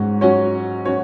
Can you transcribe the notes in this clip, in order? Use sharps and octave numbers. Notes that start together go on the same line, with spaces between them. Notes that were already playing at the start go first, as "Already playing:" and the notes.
Already playing: G#2 C#4 F#4
F#3 C#4 F#4 C#5
F#3 C#4 F#4 C#5